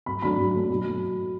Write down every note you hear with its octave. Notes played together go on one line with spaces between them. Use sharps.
F#2 B5
F#3 A3 D4 B5
F#2
F#3 A3 D4
B2
F#3 A3